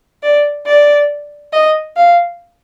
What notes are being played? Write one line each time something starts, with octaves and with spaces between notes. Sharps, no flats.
D5
D5
D#5
F5